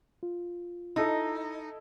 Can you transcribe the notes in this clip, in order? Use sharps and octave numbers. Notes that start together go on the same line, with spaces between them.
F4
D#4 E4 A4 D#5